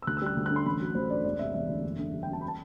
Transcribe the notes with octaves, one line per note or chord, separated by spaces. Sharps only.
E6
D2 F#6
E6
G3 F#6
D2
F#6
D3
C6
A1 B5
F#3
A1 C5
G2 D5
E1 D5
C3 E5
E1 E5
D2
F#1
D3
G3
G5
F#2 A5
B5
A5